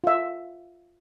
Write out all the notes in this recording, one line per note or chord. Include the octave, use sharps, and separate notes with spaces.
F4 E5